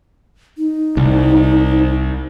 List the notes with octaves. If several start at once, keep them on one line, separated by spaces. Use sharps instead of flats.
D#4
C2